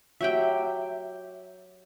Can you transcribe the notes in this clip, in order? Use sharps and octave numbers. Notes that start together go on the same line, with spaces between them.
F#3 G4 E5 G5